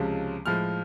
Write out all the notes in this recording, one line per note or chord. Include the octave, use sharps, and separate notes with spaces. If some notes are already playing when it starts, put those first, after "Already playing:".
Already playing: C#2 C3 F3 G#3 C#4
A2 F3 G#3 F6